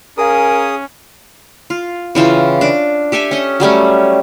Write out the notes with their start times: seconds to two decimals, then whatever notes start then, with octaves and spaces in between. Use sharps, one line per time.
0.18 C#4 G#4 A#4 F5 G#5 A#5 D#6
1.70 F4
2.15 C#3 E3 F4 G5
2.61 D4 D6
3.12 G4 A4 E5 G#5
3.31 C#4 D#5
3.60 F#3 G3 A3 C#4